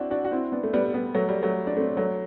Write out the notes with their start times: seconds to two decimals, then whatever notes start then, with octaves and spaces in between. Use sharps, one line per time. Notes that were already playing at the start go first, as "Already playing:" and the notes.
Already playing: C4 D4 E4 F#4
0.11 D4 F#4
0.25 F#4
0.31 C4 E4
0.52 B3 D4
0.63 A3
0.73 G3 B3
0.94 G3 B3
1.15 F#3 A3
1.29 G3
1.42 F#3 A3
1.67 D4
1.77 A3 C4
1.97 F#3 A3